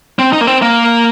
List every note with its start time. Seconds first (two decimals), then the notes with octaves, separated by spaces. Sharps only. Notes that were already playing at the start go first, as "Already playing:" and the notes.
0.19 C4
0.33 D#4
0.41 A#3
0.47 C4
0.62 A#3